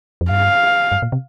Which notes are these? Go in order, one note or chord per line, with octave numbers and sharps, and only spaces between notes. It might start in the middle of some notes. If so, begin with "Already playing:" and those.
F2
G2 F5
G2
A#2
C3